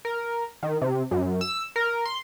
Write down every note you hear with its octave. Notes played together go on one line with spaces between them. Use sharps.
A#4
D#3
C3
F#2
E6
A#4
C6